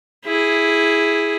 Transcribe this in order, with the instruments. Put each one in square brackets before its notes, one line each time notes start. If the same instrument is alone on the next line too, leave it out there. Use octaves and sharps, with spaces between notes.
[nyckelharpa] E4 G#4